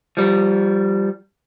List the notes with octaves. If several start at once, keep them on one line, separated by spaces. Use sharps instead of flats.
F3 G3